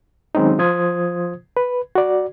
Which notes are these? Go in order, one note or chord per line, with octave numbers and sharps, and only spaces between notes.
D#3 F#3 G#3 C4 C#4 D#4
F3 F4 C5 D#6 G#6
B4
F#4 D5